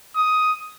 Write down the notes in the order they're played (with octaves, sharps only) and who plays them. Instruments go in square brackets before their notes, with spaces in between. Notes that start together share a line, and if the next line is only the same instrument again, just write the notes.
[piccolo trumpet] D#6